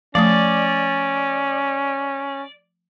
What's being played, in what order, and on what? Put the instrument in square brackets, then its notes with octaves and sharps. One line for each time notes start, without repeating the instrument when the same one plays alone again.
[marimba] F3 A3 D#6 [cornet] C#4 [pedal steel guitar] D5